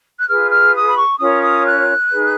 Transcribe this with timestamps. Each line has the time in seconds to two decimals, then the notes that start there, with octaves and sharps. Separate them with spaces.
0.18 F#6
0.28 F4 G#4 B4 F6
0.51 F6
0.74 D#6
0.88 B5
0.97 C#6
1.19 C#4 F4 A#4 C#5 D#6
1.43 D#6
1.65 F#6
2.10 D#4 G#4 B4